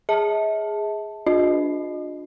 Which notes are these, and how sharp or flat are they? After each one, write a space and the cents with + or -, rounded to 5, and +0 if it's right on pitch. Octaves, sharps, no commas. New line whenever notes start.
G#4 +0 E5 -40 A5 +0
D4 +0 F4 +35 D#5 -15